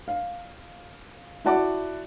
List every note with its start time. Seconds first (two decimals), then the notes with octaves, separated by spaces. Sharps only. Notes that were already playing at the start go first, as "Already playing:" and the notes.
0.08 F5
1.45 E4 F#4 D5 F#5 A5 D6